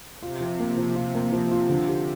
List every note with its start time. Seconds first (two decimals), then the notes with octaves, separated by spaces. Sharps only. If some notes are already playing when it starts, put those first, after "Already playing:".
0.22 C3 F4
0.40 F3
0.60 A#3
0.77 F3
0.96 F4
1.15 A#3
1.32 F3
1.51 F4
1.69 D3
1.88 G4